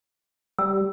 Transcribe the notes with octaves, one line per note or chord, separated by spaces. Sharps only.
G3 E6